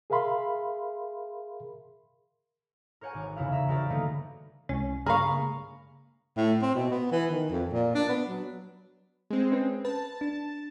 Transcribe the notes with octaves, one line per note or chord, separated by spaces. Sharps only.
G#4 A#4 E5 F5 B5 C6
A#4 C5 C#5 F#5 G#5
G#1 D6
F1 E2 C#3 E4 F5
E5 A#5 E6
F3 F#4 G#4 A#4 B4 D5
D3 E3 G3 A3 A#3 D#4
C2 G#3 C#4
G2 C#3 A#3 G#4 F5 A#5 B5 C#6
A2
C4
B2
B3
E3
D#3
F2
A#2
D4
B3
F#3
G#3 C4
C#4 B4
B4 A5
D4